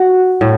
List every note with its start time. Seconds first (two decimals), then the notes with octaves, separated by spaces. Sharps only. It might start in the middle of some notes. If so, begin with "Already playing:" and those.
Already playing: F#4
0.41 A2